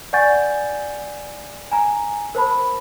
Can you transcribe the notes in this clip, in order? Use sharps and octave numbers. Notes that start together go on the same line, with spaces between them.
D5 F#5 G#5 C#6 G6 A6
G#5 A#5
A#4 C5 A5 B5